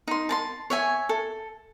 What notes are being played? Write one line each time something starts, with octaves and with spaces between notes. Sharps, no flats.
D#4 C6
A5 A#5 C6
C#5 E5 G#5
A4